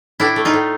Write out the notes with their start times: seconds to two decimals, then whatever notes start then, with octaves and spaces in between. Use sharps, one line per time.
0.20 A2 D4 E4
0.36 A3
0.45 D#4 F4
0.53 A2